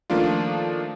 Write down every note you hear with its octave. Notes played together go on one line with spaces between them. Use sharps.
D#3 F3 A3 A#3 D4 F4